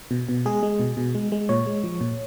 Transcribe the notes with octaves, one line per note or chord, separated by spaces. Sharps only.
B2
B2
G#3 G#4
G#3
B2
B2
G#3
G#3
A#2 C#5
G#3
F3
A#2